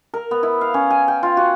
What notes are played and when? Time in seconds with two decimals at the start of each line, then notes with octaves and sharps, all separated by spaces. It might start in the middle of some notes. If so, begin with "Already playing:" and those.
0.14 A#4
0.31 B3
0.43 E4
0.61 F5
0.74 C#4
0.90 G#5
1.08 G5
1.23 F4
1.37 F#4